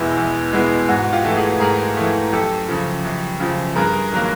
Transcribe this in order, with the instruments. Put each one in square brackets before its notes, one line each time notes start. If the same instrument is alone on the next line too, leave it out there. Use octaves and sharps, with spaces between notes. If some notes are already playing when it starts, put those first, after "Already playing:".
Already playing: [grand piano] E2 B2 G#3 B3 E4
E2
B2 G#3 B3 E4
G#2 F#4
F4 G4
E3 A3
F#4 G#4
G#2 G#4 A#4
E3 A3
F#2 G4 A4
C#3 F3
F#2
C#3 F3
G2 G#4 A#4
D#3 F#3 A#3